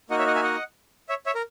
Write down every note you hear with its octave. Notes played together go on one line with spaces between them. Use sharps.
A#3 D#4 F#4 D#5 F#5
C#5 E5
D#5 F#5
E5 G#5
D#5 F#5
C#5 E5
C#5 E5
A#4